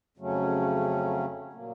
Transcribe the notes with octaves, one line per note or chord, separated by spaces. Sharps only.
F2 C#3 F#3 A3 C#4
A#2 F#3 A#3